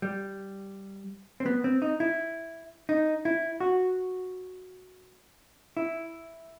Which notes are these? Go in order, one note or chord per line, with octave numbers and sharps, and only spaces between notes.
G3
C4
B3
C4
D#4
E4
D#4
E4
F#4
E4